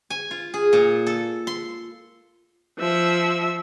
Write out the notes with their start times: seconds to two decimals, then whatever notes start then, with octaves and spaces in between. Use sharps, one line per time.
0.10 G#5
0.31 F4
0.54 G#4
0.73 A#2
1.07 A4
1.47 C6
2.79 F3 E5